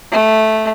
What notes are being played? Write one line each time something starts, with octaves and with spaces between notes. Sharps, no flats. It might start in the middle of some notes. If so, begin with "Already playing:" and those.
A3